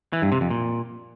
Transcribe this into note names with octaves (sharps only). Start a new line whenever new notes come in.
E3
G2
C3
F2
A#2